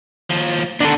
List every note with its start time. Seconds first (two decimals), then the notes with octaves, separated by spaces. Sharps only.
0.30 D#2 F3
0.80 B2 D#3 D4 A4